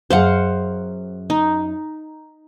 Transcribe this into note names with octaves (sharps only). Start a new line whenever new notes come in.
F#2 G#4 C5 F5 F#5
D#4